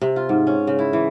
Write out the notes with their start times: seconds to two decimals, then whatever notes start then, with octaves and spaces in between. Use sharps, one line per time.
0.02 C3
0.16 F4
0.29 G#2
0.47 C#4
0.67 C#3
0.79 E4
0.93 E3